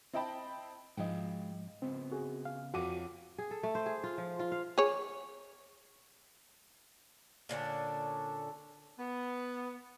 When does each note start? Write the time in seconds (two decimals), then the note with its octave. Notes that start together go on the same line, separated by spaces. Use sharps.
0.13 C4 E4 D#5 G5 A5 B5
0.97 G#2 F3 G#3 D#5 F5 G5
1.82 C#3 B3 C4
2.11 F#4 G#4
2.45 F5
2.74 F2 F#4 C#5 F5 F#5 D6 D#7
3.38 G#4
3.51 A4
3.63 A3
3.75 C5
3.86 G#4
4.04 F4
4.18 F3
4.39 F4
4.52 F5
4.78 G#4 C#5
7.49 A#2 D3 C#4 D4
8.98 B3